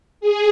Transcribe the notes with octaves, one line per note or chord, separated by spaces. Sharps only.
G#4